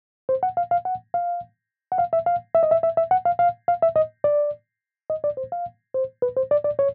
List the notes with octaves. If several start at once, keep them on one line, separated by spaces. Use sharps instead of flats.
C5
F#5
F5
F5
F#5
F5
F#5
F5
E5
F5
E5
D#5
E5
E5
E5
F#5
F5
F5
F5
E5
D#5
D5
D#5
D5
C5
F5
C5
B4
C5
D5
D5
C#5